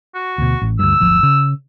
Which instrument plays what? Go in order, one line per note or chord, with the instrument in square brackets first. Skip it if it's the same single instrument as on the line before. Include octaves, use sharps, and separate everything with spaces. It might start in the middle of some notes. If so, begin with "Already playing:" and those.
[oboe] F#4
[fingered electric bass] D2 B2
A1
[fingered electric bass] D2 G2 [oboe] E6
[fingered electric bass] D1 G1 F3
C#3